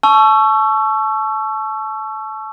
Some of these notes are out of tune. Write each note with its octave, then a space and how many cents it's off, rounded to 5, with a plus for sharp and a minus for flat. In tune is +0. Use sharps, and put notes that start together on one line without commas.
A5 -25 C#6 +10 E6 +25